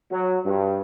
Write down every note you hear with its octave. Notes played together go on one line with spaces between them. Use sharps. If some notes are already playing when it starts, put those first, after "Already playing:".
F#3
G2